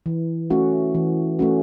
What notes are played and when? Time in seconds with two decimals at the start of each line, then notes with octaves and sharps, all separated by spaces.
0.06 E3
0.50 A3 C#4 F#4
0.95 E3
1.39 A3 C#4 F#4